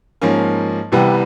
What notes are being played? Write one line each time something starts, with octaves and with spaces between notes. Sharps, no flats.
G#2 F3 A#3 C#4
C2 C3 E3 G3 B3